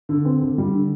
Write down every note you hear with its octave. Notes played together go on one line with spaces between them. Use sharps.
D3
C4
D3
G3
D3